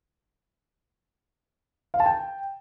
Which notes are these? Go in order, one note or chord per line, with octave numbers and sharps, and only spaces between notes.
F5
A5
G5